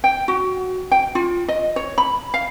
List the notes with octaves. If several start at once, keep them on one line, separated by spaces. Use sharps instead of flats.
G5
F#4
G5
F4
D#5
C#5
B5
F5